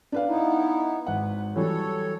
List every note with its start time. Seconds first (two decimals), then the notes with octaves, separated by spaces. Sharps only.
0.12 D4 B4 F5
0.28 B3 D#4 E4
1.06 G#1 B4 F#5
1.56 E3 F#3 G3 A4 C#5